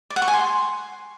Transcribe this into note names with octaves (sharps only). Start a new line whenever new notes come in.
D5
F#5
C#6
G#5
C6